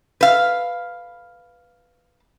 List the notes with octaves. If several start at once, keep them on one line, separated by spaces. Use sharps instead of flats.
B4 F5